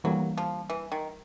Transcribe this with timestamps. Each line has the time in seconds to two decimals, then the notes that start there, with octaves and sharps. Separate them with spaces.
0.04 E3 F#3 G3 A#3
0.38 F3
0.70 E3
0.92 D#3